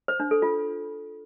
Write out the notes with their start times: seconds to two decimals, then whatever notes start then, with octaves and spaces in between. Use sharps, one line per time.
0.08 C5
0.20 D4
0.31 A4
0.42 F4